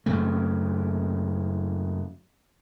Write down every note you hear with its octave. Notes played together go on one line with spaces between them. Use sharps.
F#2 C#3 A3